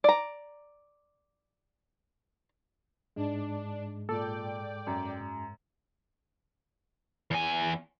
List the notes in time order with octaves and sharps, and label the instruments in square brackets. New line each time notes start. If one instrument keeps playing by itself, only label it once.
[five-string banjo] D5 A#5
[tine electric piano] G#2 G#3 [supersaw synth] D4
[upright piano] A#2 [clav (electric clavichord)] A4 [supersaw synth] D5 G5
[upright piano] F#2
[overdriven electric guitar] E2 G#5